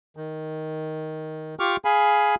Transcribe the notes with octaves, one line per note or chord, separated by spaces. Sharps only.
D#3
F4 G4 C#6 D6 F6
G#4 F5 G#5 B5